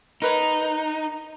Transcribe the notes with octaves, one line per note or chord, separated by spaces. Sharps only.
D#4 A#4 B4 C#5